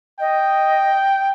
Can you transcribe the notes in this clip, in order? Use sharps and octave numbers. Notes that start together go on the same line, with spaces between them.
D#5 G5